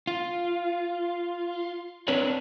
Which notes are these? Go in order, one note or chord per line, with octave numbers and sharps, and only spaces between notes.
F4
C4 D4 A#4 B4 C#5